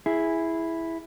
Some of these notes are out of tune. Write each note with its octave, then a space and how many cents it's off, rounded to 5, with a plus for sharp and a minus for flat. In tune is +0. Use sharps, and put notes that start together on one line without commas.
E4 +0 G#4 +0